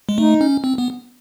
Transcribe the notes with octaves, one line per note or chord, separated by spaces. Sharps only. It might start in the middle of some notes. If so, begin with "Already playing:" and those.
G#3
A3 D#4
C#4
C4
B3